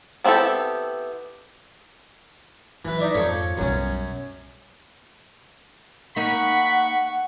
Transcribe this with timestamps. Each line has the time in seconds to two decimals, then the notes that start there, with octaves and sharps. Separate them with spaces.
0.24 B3 C4 E4 G4 A4
2.85 E3 F#3 B4
2.99 D#4 D5 E5
3.14 F2 G#2 F3 A4 C#5
3.58 B1 F#2 G3 C#4
6.16 A#3 D#4 F#5 B5 C#6